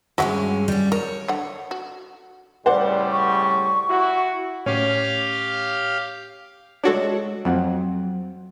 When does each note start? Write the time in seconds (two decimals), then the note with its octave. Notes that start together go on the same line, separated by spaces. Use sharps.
0.18 G2 G#3 C#4 F#4 E5 F#5
0.68 G3 C#4
0.92 A#4 C#5
1.28 D3 F#5
1.71 F#4
2.66 A2 C#3 G3 C5 D5 F#5
3.12 C#6
3.89 E4 F#4
4.66 A2 C#4 G4 F5
6.84 G#3 D4 F#4 A4 C#5
7.45 F2 F#3 C4 F#5